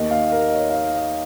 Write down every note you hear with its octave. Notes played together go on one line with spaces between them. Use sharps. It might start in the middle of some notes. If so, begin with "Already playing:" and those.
Already playing: D#2 D#3 D#5
F5
A#4
D#5
C#5
F5
D#5
D#5